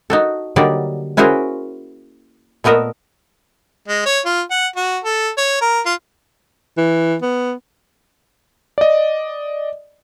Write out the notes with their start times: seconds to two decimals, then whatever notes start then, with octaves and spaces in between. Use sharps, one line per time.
0.10 D#4 F#4 A4
0.56 D3 F#3 G3 A#3 D#4 D5
1.17 C#4 E4 F#4 G#4 A#4 C5
2.64 A#2 A3 B3 A#4 D#5 E5
3.88 G#3
4.06 C#5
4.25 F4
4.51 F#5
4.76 F#4
5.04 A4
5.37 C#5
5.61 A#4
5.86 F4
6.77 E3
7.22 B3
8.78 D5 D#5